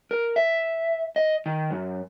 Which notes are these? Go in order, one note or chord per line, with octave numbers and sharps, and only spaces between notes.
A#4
E5
D#5
D#3
F#2